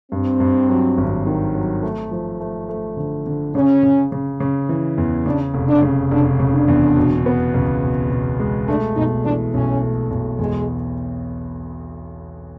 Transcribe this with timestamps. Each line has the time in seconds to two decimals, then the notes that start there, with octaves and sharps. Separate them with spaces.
0.12 G2 C4
0.40 G2
0.69 F#3
0.98 G#1
1.27 D#3
1.55 F#3
1.83 A3
2.11 F3
2.40 A3
2.69 A3
2.97 D3
3.27 D3
3.55 C#3 C#4
3.83 C#3
4.12 C#3
4.40 C#3
4.69 E3
4.98 E2
5.26 C#3 D4
5.54 F1
5.69 D4
5.83 C#3
6.11 F1 D4
6.40 C#3
6.54 D4
6.68 E2
6.97 B2
7.26 B3
7.55 C#2
7.83 B2
8.12 B2
8.40 G#3
8.68 A3 D4
8.97 B1 D#4
9.25 E3 D4
9.54 B1 C#4
9.83 A3
10.11 B1
10.39 E2 G#3